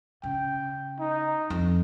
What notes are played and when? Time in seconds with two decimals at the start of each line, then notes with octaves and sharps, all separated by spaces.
0.23 C#3 G5
1.00 D#4
1.50 F2